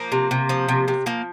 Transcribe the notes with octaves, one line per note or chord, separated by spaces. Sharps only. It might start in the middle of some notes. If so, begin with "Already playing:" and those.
Already playing: F3 A#3
C3
C3
F3
C3
C3
F3 A#3